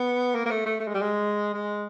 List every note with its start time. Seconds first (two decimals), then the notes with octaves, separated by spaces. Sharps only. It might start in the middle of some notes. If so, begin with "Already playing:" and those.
Already playing: B3
0.35 A#3
0.46 A#3
0.50 A3
0.65 A3
0.80 A3
0.88 G#3
0.94 G3
1.02 G#3
1.54 G#3